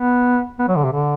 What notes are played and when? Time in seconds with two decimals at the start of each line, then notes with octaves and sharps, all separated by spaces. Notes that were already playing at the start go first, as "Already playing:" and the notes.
Already playing: B3
0.59 B3
0.68 F#3
0.76 D3
0.84 C3
0.93 D3